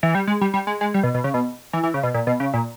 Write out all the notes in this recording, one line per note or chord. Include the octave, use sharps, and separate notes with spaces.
E3
G3
G#3
G3
G3
G#3
G#3
G3
B2
B2
C#3
B2
E3
E3
C#3
B2
A#2
B2
C#3
A#2